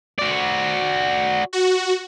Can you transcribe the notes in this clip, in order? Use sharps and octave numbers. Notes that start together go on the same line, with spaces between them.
F#4 D5
F#4